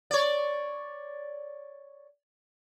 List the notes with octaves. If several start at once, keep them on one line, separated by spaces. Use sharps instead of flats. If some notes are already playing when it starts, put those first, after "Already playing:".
C#5 D5